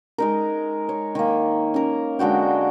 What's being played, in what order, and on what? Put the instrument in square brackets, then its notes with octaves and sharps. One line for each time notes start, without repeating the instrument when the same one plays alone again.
[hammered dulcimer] G#3 D#4 A#4
C#5
D#3 A#3
C#4 A#4
D3 G#3 F#4 G5